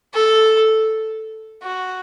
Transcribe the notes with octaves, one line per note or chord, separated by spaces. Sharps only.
A4
F#4